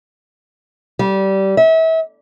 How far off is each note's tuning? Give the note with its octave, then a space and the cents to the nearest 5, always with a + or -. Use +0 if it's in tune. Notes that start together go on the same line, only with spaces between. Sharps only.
G3 -20
E5 -30